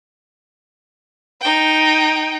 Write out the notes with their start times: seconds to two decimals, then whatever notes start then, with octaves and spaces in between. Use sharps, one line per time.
1.41 D#4 G5